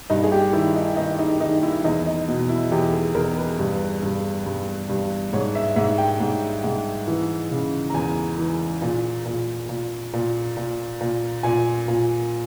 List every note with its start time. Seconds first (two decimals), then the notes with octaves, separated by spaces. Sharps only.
0.10 G2 D#4
0.23 G#4
0.32 G4
0.53 D#3 E4
0.76 D#4
0.96 D#3 D#4
1.19 D#4
1.40 D#3 D#4
1.63 E4
1.84 E2 D#4
2.06 D#4
2.28 B2
2.49 E4
2.71 E2 G4
2.93 G#4
3.14 E2 A#4
3.37 B4
3.59 G2
4.03 G2
4.46 G2
4.89 G2
5.33 G#2 C#5
5.55 E5
5.76 G#2 E5
5.98 G5
6.20 G#2
6.64 G#2
7.08 E3
7.51 C#3
7.90 A#5
7.94 E2 G#5
8.39 E3
8.82 A#2
9.26 A#2
9.69 A#2
10.13 A#2
10.57 A#2
11.01 A#2
11.43 A#2 G#5
11.88 A#2